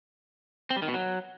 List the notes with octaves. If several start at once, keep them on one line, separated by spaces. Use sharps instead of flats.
C4
G3
D#3
B2
F#3